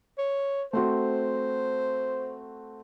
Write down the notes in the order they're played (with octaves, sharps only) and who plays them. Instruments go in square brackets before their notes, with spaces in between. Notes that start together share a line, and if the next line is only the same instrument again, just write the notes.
[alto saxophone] C#5
[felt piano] A3 C4 F#4 [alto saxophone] C5